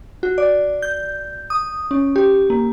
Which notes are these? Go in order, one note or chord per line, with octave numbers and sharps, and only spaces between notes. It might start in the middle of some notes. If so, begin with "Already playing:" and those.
F#4
D5
G6
D#6
C#4
G4
A#3